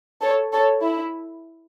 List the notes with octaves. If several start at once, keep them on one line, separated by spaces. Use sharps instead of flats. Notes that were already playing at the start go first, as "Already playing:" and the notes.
A4 C#5
A4 C#5
E4